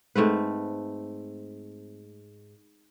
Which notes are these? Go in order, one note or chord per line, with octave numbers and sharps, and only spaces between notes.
G#2 A3 C4 B4